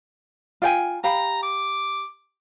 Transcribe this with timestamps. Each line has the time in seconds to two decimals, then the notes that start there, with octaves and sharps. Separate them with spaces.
0.62 F4 G5 G#5
1.04 G4 F5 A#5 B5
1.43 D6